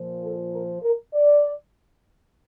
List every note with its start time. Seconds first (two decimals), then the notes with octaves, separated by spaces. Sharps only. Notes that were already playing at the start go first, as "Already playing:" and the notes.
Already playing: A#2 F3
0.21 A4
0.51 A#4
0.83 A#4
1.14 D5